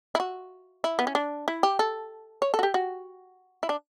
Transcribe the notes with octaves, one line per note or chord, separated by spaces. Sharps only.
E4
F#4
E4
B3
C#4
D4
E4
G4
A4
C#5
A4
F#4
G4
F#4
E4
D4